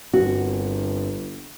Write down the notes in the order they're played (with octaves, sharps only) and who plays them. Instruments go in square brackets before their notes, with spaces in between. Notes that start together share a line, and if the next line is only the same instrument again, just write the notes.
[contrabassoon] G1 [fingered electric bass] G2 C4 [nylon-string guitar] F#4